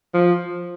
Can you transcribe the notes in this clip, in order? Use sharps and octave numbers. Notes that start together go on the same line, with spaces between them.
F3